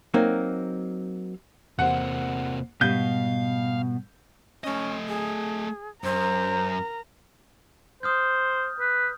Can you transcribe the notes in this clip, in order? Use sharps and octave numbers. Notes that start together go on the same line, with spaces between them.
F#3 A#3 C4 D#4
E2 C3 A#3 C5 F#5
G#2 B2 G3 F5 G6
A3 C#4 D#5
G#4
F#2 A#4 C5 A#5
C5 D#6 F6 G6
B4